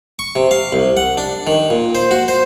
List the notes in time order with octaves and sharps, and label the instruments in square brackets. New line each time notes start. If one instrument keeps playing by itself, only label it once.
[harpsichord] C#6
C3
F5
C2
F#5
D4
D#3
A#2
C5
F#4
C5